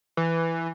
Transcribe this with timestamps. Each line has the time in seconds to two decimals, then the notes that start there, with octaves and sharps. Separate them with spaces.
0.17 E3